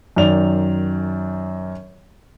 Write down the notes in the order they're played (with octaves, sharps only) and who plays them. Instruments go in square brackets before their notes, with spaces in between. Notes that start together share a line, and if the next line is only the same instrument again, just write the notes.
[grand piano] F#2 D#3 D5 F7